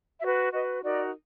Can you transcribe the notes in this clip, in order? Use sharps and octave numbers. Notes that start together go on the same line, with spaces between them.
F#4 E5
B4
F#4 B4 D#5
D#4 F#4 A#4 D5